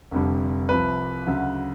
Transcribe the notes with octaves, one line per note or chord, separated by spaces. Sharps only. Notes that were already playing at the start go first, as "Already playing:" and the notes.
F1 F2 D3 G3
C2 C3 F3 B4
D2 C#3 F#3